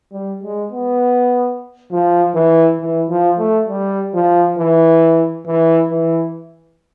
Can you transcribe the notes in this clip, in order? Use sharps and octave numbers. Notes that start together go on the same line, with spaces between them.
G3
G#3
B3
F3
E3
E3
F3
A3
G3
F3
E3
E3
E3